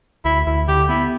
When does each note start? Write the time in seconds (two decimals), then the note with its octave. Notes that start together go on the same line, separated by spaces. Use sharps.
0.25 D2 E4
0.46 D2 E4
0.68 D3 G4
0.89 B3 E4